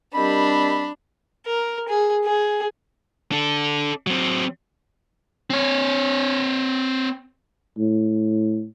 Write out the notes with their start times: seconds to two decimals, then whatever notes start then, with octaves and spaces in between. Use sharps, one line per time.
0.15 G3 C4 D4 G4 A#4 D#5 B5
1.46 A#4
1.88 G#4
2.25 G#4
3.32 D4 A4
4.07 F#3 C4
5.50 C4 C#5
7.78 A2